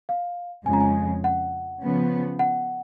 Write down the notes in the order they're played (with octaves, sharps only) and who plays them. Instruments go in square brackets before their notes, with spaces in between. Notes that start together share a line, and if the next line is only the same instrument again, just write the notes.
[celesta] F5
[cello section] F2 C#3 G#3 [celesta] G#5
[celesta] A#5
G#5
F#5
[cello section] C#3 F3 B3
[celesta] F#5